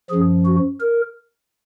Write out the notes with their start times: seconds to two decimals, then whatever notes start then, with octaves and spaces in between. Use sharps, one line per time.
0.11 F#2 F3 G#4
0.46 F#4
0.80 A#4